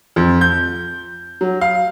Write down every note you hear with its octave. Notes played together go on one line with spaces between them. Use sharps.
F2
G6
F#3
F5